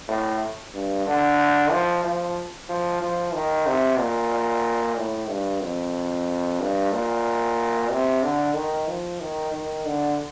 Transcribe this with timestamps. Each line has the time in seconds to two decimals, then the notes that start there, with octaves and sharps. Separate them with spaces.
0.08 A2
0.73 G2
1.06 D3
1.71 F3
2.04 F3
2.69 F3
3.02 F3
3.34 D#3
3.66 C3
3.99 A#2
4.97 A2
5.29 G2
5.62 F2
6.60 G2
6.92 A#2
7.90 C3
8.23 D3
8.55 D#3
8.87 F3
9.20 D#3
9.53 D#3
9.85 D3